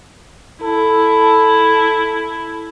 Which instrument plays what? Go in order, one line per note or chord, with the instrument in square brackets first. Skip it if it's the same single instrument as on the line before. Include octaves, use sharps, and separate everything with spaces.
[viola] E4 [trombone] A4